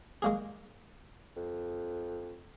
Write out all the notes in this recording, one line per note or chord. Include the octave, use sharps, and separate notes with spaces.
G#3 A#3 G#4
F2